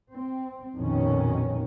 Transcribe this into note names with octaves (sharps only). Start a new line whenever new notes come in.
C4
A#1 F2 B2 D#3 C#4